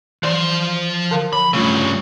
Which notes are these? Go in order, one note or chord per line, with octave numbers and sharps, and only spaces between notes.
E3 F3 C5 D5
D3 A#4 F5
F3 B5
G2 C#3 A3 F4